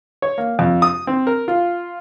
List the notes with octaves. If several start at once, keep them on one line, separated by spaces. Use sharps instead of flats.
C#5
A#3
F2
D#6
C4
A#4
F4